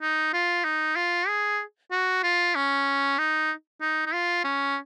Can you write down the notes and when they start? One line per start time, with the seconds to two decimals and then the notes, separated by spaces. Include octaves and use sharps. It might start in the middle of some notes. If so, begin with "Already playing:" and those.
0.02 D#4
0.33 F4
0.65 D#4
0.96 F4
1.28 G#4
1.91 F#4
2.23 F4
2.55 C#4
3.18 D#4
3.81 D#4
4.06 D#4
4.14 F4
4.44 C#4